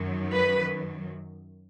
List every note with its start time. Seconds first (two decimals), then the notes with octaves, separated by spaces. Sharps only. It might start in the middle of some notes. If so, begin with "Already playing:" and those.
Already playing: F#2 D#3 F#3
0.32 B4